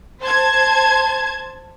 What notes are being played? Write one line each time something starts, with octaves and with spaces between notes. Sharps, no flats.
C5 A5 G#6